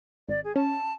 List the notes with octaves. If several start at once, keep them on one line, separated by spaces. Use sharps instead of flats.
G#1 D5
G#4
C#4 A5